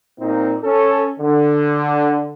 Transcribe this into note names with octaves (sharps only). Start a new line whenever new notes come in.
A#2 A#3 C4 D#4
C#4 A4
D3